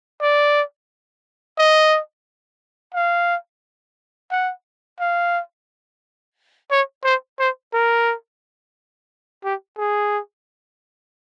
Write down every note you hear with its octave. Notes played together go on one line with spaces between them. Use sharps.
D5
D#5
F5
F#5
F5
C#5
C5
C5
A#4
G4
G#4